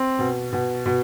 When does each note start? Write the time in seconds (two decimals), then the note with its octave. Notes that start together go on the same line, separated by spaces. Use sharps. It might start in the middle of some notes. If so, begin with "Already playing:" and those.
Already playing: C4
0.19 B2
0.53 B2
0.86 B2